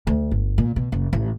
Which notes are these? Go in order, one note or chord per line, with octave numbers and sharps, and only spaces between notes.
D2
G1
A#2
B2
F#1
A1